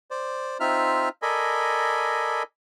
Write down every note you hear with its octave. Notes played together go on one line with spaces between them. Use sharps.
C5 D5
C4 D#4 F4 E5 F6
A4 A#4 D5 D#5 G#5 B5